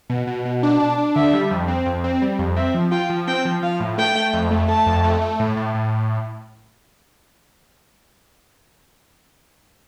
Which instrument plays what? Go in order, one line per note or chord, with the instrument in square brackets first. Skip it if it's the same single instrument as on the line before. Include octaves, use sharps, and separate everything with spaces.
[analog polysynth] B2
B2
B2
D4
[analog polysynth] D4 [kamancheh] A5
[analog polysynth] D4
[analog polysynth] D3 [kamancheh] E5
[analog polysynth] G3
F2
C4
F2
C4
G3
F2
[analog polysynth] C4 [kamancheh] E5
[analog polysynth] F3
[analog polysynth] F4 [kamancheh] G5
[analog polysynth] F3
[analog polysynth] C4 [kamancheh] G5
[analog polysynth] F3
[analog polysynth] F3 [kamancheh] F5
[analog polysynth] A2
[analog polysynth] A3 [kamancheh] G5
[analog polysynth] A3
F2
A3
[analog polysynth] A3 [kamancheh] A5
[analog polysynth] F2
A3
A3
A2
A2
A2